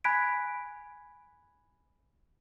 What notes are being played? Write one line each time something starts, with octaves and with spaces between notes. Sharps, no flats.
G#5 B5 F#6 G#6 B6 D7